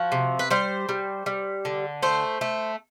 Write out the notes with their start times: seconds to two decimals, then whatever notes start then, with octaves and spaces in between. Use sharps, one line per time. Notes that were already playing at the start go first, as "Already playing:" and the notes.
Already playing: F3 F#4
0.12 C3
0.39 B4
0.51 G3 C5
0.89 G3
1.26 G3
1.65 D3
2.03 A3 C5
2.41 A3